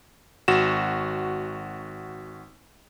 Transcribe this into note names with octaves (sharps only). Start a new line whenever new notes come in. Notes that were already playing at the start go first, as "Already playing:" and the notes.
G#1 F#4 E7